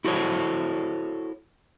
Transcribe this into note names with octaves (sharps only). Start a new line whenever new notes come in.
E4 F#4 A4 C5 C#5